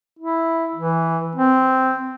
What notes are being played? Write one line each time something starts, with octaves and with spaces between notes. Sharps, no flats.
E4
E3
C4